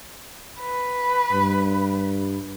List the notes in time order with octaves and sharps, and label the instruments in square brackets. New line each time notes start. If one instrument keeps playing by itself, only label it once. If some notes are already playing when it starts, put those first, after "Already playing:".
[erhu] B4
[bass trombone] G2